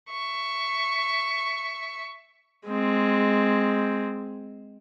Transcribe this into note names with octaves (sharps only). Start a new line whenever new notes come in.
E5 C#6
G#3 C4